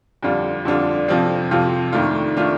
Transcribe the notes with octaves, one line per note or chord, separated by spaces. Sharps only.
F2 D3 G3 D4 F4
F2 D3 G3 D4 F4
F2 C3 F3 C4 F4
F2 C3 F3 C4 F4
F2 D#3 A3 D4 F4
D#3 A3 D4 F4